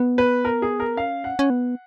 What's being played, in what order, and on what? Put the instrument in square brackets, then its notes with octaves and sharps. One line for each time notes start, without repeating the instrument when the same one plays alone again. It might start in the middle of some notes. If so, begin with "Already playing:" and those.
Already playing: [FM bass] B3
[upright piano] B4
A#4
G#4
A#4
[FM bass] C#4 [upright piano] F5
[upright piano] F#5
[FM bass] C#4
B3